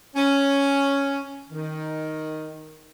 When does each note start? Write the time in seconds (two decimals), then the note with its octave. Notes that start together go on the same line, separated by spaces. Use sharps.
0.16 C#4
1.50 D#3